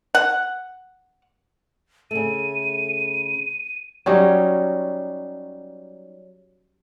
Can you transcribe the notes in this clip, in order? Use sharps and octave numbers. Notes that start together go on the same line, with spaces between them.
F#5
C#3 A3 D#7
F#3 G3 C#4 D#4